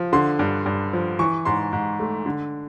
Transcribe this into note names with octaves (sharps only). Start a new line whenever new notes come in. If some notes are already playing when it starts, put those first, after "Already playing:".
Already playing: F3
D3 C6
G2
G2
F3
E3 C#6
G#2 C6
G#2
A3
D3